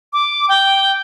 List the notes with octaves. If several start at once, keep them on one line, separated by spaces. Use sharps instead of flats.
D6
G5